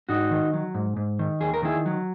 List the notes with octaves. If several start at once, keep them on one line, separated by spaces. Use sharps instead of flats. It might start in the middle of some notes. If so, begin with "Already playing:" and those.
G#2 D#4 F#4
D#3
F#3
G#2
G#2
D#3
D#2 G#4
A#4
D#3 E4 G#4
F#3